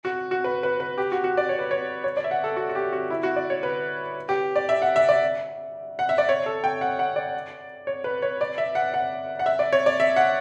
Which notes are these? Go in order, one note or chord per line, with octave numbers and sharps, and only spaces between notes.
F#4
F#4
B4
B4
B4
G4
F#4
F#4
D5
C#5
B4
C#5
C#5
D5
E5
F#5
A4
F#4
F#4
G4
F#4
E4
F#4
D5
C#5
B4
G4
D5
E5
F#5
E5
D5
F#5
E5
D5
C#5
A4
G5
F#5
F#5
D5
C#5
B4
C#5
D5
E5
F#5
F#5
F#5
E5
D5
C#5
D5
E5
F#5